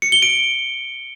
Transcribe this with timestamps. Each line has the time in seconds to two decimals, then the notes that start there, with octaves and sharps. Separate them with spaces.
0.02 C#7
0.12 G7
0.22 D7